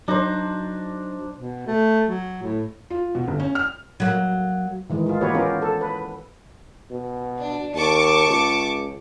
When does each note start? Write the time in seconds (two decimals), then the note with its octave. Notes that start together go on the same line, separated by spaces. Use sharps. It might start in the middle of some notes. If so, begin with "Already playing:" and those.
0.08 F#3 D4 D#4 C5
1.36 B2
1.67 A3
2.07 F#3
2.42 A2
2.90 F4
3.15 B2
3.28 G1
3.40 C#4
3.55 F6
4.00 F#3 A#3
4.90 D#3 E3 G#3
5.07 G#3 F4
5.21 E3 A#3 F#4 G4 B4 C#5
5.34 B3 C#4 F4 G4 G#4 A#4
5.62 A4
5.81 B4
6.91 B2
7.39 D4
7.75 D#2 A5 C#6 D6
8.28 C#2